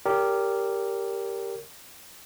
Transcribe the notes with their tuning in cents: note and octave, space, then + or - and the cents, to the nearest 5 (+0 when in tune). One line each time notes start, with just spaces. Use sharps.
G4 +0 A#4 -10 C#5 +45